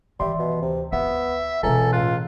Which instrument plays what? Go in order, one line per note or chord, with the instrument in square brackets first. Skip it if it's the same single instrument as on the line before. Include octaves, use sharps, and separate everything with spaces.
[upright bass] D#3 E3 [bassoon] G3 [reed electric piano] D5 E5 C6
[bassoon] B2
[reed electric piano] D2 [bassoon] C3
[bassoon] B3 [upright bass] F4 [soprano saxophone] E5
[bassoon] C#2 [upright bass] B2 E3 [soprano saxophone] A4 [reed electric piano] G#5 A#5
[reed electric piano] A2 F#6 [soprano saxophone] F4